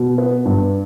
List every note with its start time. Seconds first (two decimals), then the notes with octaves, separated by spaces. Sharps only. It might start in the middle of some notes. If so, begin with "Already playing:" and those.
Already playing: B2
0.18 B3
0.45 G2